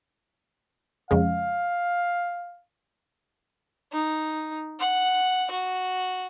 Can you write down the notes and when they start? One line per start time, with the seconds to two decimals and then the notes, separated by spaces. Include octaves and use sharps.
1.11 F2 C#3 G#3 F5
3.92 D#4
4.80 F#5
5.51 F#4